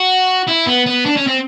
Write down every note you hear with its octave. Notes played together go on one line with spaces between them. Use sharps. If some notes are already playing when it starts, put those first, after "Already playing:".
Already playing: F#4
E4
B3
B3
D4
C#4
C4